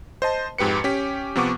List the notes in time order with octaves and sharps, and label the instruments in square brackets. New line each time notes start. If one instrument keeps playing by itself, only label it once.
[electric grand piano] C5 D#5 A5
F2 G#2 G4 B4 C#7
C#4 G4 B6
C3 F3 B3 F#5 C#6 D6